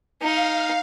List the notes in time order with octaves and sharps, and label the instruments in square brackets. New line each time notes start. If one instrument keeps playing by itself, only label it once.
[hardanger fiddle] D#4 [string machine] F5